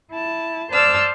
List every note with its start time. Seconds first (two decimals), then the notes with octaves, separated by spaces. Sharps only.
0.11 E4 A5
0.72 C5 D5 A5 E6 F6